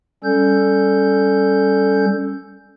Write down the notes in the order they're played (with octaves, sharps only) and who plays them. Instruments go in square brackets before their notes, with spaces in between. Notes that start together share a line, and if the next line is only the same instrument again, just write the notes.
[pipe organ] G3 C#4 A4 G6